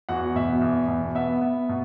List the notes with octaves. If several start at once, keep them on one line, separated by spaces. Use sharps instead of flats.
E2 F#4 F#5
B2 E5
E2
B2
B3 E5
B3
B2